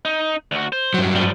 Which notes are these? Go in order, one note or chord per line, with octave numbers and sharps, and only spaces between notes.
D#4
D2 F#4
C5
G2 F#3
F3 G3